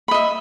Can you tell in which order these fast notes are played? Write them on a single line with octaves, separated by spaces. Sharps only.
B5 D#5 E5